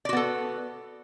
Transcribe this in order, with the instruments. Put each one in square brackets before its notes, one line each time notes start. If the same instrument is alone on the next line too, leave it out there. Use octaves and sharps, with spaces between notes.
[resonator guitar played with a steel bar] D5
F#4
B3
A4